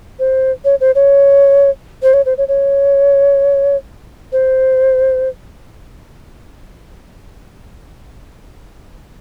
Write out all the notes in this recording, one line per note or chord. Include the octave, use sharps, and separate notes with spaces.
C5
C#5
C5
C#5
C5
C#5
C5
C#5
C#5
C5